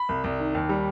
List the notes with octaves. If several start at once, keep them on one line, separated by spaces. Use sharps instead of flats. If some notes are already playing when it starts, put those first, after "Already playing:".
Already playing: B5
C2
C2
D#3
D#2
G3